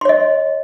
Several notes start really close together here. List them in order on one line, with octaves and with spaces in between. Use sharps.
C6 C#5 D#5